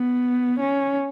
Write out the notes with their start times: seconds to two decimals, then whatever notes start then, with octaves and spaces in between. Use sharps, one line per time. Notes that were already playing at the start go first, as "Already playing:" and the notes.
Already playing: B3
0.59 C#4